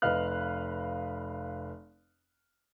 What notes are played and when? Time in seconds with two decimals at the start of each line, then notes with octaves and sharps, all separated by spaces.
0.02 F1 B4 D#5 F5 F6 F#6